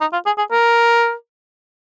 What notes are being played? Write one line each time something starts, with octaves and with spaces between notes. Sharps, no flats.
D#4
F4
G#4
G#4
A#4